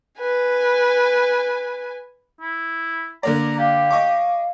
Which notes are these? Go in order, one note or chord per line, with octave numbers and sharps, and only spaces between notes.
B4 G#5
E4
D3 A#3 D5 A#5
G4 F5
D#5 C#6 D6